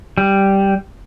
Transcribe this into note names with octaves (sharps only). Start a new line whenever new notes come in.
G3